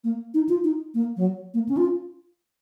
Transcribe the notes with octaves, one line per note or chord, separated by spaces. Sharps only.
A#3
D#4
F4
D#4
A#3
F#3
A#3
C#4
F4